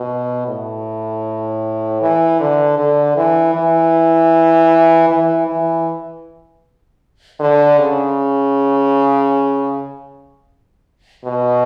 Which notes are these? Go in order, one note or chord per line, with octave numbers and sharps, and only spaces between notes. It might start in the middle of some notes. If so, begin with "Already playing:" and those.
Already playing: B2
A2
E3
D3
D3
E3
E3
E3
E3
D3
C#3
B2